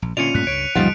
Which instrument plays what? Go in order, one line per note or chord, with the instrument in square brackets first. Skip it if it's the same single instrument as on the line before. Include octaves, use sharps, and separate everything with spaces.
[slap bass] A#1
[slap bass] A#2 D3 [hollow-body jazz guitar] C#4 F4 D5 [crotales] C#7 D#7 F7
[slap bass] G2 A#2 A3 [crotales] F#6 B6
[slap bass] C#2 G2 [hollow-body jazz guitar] C#5 [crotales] D7
[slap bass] C#2 F#2 A#2 [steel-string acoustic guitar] F3 G3 [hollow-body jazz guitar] D#4 F5 F#5